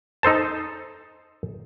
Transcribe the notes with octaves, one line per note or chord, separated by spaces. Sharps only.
D#4 A4 C5 A5